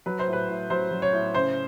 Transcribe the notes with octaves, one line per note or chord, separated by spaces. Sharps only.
F#3 B4
C5
A2
B4
A2
F#3 C5
F#3
C#5
A2
C#3 C5